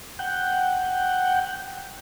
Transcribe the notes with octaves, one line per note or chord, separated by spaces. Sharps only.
F#5 G5